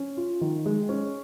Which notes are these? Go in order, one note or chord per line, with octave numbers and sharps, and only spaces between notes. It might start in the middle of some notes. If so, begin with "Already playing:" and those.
Already playing: C#4
F4
D#3
G#3
C#4